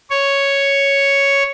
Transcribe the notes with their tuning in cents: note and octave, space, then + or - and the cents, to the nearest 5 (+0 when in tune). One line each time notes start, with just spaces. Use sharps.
C#5 +0